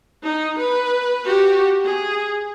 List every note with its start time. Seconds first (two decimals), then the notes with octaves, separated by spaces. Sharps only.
0.23 D#4
0.59 B4
1.25 F#4 G4
1.85 G#4